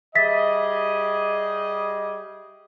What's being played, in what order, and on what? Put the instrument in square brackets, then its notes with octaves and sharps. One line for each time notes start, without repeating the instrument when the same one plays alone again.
[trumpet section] G3 G#4 D#5 [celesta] E5 A6 B6